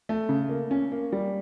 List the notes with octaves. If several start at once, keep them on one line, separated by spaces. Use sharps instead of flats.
A3
C#3
A#3
C#4
A#3
G3